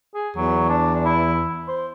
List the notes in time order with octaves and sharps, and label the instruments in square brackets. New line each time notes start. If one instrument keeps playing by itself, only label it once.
[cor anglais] G#4
[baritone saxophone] E2 [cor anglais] F#3
[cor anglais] D4
E4
C5